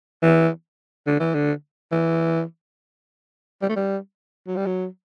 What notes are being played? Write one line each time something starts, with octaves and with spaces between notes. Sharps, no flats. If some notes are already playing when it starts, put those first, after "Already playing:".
E3
D3
E3
D3
E3
G3
A3
G3
F#3
G3
F#3